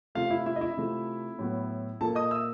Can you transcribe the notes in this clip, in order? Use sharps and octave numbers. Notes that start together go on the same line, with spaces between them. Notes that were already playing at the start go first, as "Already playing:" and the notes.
C3 F3 A3 F4 F5
E4 E5
E4 E5
D#5
E4 E5
C3 F3 A3
A2 F#3 B3
A#2 F3 A#3 A4 A5
D#5 D#6
E5 E6